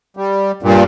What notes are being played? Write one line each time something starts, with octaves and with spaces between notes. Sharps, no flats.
G3
G2 A#2